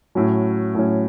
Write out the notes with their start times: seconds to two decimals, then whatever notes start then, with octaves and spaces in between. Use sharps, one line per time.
0.15 A2 F#3 C#4
0.75 A2 F#3 C#4